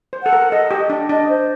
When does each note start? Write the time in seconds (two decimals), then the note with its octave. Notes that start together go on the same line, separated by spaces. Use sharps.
0.13 C5
0.23 A4 F#5
0.33 A#4
0.51 A4 D#5
0.71 G4
0.90 D4
1.09 D4 D#5
1.29 C5